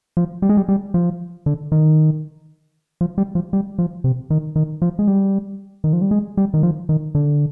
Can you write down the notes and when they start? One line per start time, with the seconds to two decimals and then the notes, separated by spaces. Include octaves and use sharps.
0.17 F3
0.42 G3
0.49 G#3
0.57 G3
0.69 G3
0.94 F3
1.46 D3
1.72 D#3
3.01 F3
3.18 G3
3.35 F3
3.53 G3
3.79 F3
4.04 C3
4.30 D#3
4.56 D#3
4.82 F3
4.99 G#3
5.07 G3
5.84 D#3
5.93 F3
6.02 G3
6.11 G#3
6.37 G3
6.54 D#3
6.63 F3
6.89 D#3
7.15 D3